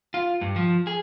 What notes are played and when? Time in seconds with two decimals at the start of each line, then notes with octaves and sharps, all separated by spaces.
0.14 F4
0.41 G2
0.56 F3
0.87 G#4